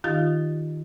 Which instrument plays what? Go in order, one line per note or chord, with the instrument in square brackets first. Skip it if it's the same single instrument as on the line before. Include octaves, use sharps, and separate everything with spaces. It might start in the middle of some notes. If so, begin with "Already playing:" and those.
[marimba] D#3 D#4 F4 G4 F5 A6